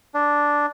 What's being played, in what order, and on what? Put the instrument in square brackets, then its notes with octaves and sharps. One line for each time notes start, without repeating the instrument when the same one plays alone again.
[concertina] D4